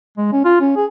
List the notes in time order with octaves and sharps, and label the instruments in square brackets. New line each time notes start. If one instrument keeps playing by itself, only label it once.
[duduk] G#3
C#4
F4
C#4
G#4